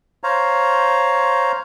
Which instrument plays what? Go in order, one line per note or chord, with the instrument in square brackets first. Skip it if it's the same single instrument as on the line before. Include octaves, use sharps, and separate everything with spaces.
[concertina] C5 C#5 F5 A#5